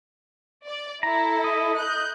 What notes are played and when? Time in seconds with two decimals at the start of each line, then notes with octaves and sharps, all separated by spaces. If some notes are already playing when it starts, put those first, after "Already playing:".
0.67 D5
1.03 E4 A4 A#5
1.44 D#5
1.78 F#6 G6